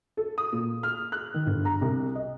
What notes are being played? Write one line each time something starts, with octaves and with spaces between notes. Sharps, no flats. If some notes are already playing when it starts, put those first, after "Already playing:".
A4
D#6
A#2
F6
F#6
D#3
G1
A#5
C2
D#5